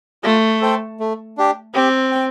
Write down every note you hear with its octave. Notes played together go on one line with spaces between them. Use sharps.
A3 F4
A4 C5 G5
A3
D4 G4
C4 G4
G5